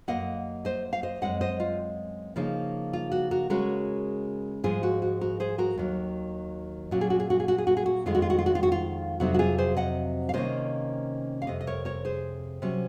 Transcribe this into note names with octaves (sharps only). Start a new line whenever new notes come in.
F#2 D#3 A#3 D#5 F#5
C5 D#5
F5
C5 D#5
F#2 D#3 G#3 C4 D#5 F#5
C5 D#5
F4
C#3 F3 A#3 D#4
F4
F#4
F#4 A#4
C#3 G#3 C#4 F#4 A#4
G#2 F3 G#3 F4 G#4
F#4
F#4
F#4 A#4
G#4 C5
F#4 A#4
D#2 D#3 F#3
A#2 F#3 C#4 F#4
G#4
F#4
G#4
F#4
G#4
F#4
G#4
F#4
G#4
F#4
F2 D#3 G#3 F4
F#4
F4
F#4
F4
F#4
F4
F#4
F4
F2 C3 F#3 C4 D#4 F#4
F#4
F4 G#4
G#4 C5
D#5 F#5
F5
C3 D#3 A#3 C#4 C5 D#5
F5
F2 C3 D#5
D#5
A#4 C#5
A#4 C#5
G#4 C5
C3 F#3 C#4